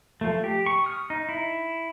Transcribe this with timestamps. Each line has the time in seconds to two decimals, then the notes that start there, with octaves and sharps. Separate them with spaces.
0.21 F3 A3
0.44 G4
0.66 C#6
0.84 D#6 F6
1.10 D#4
1.29 E4